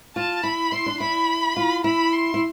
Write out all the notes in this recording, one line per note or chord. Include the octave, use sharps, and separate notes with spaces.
F4 A5
E4 B5
E4 C6
D4
E4 B5
F4
E4 B5
C6
E4